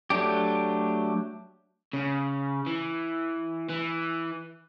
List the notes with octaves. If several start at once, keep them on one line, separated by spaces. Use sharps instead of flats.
F#3 A3 D4 G4
C#3
E3
E3